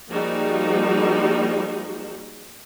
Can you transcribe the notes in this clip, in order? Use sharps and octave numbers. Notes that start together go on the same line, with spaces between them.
F3 G3 A#3 D#4 F#4 G#4